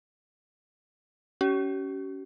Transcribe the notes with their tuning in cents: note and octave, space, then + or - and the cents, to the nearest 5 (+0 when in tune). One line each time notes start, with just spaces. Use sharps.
C#4 +15 G4 -45